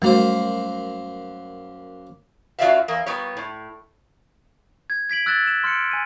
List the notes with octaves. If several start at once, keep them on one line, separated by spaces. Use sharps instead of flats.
F#2 G3 A3 A#3 F#4 C5
F#2 F#3 F4 D5 E5 F5
E2 A#3
A#2 G3 B3 C#5
A2
G#6
G#6 B6 D7 F#7
E6 F#6 G#6 A6 E7 G7
E7
C6 F6 F#6 C#7 D7
G#5 G6 D#7